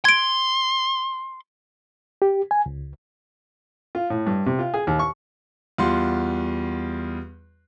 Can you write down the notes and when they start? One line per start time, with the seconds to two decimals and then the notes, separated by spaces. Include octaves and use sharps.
0.05 C6 G#6 D7
2.22 G4
2.51 G#5
2.66 C#2
3.95 F4
4.10 A2
4.27 G2
4.46 C3
4.59 F4
4.74 G#4
4.87 D#2
4.99 C#6
5.78 E2 G3 F4 F#5 C6